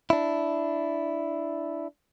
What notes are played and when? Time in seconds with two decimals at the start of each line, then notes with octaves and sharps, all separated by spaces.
0.10 D4 E4